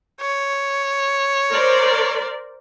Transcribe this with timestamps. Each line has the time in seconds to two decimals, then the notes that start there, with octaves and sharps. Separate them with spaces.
0.21 C#5
1.49 A#4 C5 D5